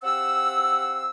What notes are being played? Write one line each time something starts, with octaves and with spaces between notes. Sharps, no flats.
C4 G4 F5 F#5 E6